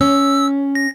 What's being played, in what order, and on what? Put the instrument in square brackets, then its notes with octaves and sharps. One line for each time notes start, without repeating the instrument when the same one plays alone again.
[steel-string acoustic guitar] C#4 [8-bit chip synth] E6
[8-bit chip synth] A#6